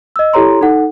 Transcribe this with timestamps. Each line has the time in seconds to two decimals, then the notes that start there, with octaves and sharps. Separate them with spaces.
0.16 D#5 E6
0.33 E4 G4 A4 C#5 A#5 C6
0.61 D#4 A4 F#5